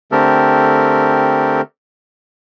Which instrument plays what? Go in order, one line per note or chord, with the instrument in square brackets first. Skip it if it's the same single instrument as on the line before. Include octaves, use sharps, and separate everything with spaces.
[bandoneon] D3 A3 C4 G4 A4 A#4